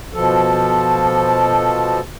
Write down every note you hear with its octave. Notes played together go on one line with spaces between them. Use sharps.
B2 F3 A4